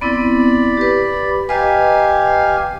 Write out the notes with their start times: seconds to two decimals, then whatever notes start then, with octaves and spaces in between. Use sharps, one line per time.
0.01 B3 C4 E4 D5 B5
0.77 G4 B4
1.49 G4 B4 D#5 F5 G#5 A#5